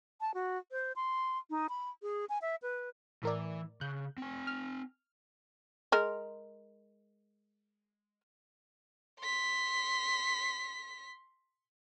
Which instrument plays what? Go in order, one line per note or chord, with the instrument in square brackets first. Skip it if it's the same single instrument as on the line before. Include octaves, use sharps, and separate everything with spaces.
[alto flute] A5
F#4
C5
C6
D#4
B5
G#4
G#5
E5
B4
[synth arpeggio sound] A2 A#4 D5 [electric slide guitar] E3
[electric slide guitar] C#3 [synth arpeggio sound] F#6 G6
[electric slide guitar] C4 G#5
[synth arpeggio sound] F6
[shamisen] G#3 A#4
[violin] C6 B6